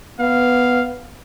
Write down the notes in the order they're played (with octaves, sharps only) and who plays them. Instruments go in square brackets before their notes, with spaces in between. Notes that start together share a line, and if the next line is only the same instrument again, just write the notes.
[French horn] B3 [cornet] F5